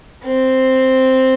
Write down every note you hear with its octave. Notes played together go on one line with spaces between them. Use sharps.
C4